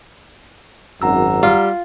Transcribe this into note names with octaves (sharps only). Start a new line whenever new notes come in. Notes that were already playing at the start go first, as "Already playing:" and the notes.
G#1 F#2 F#5 A#5 E6
G3 F4